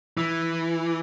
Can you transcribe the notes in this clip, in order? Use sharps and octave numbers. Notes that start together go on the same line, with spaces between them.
E3